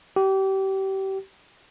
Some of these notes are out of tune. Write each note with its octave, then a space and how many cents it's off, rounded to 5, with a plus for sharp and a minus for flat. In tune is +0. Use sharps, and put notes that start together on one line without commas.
G4 -30